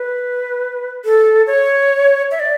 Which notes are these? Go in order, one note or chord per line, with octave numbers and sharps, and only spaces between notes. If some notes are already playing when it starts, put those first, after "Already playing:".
Already playing: B4
A4
C#5
E5
D5